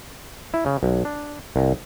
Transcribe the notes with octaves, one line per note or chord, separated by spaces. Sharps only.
E4
C#3
B1
D4
C2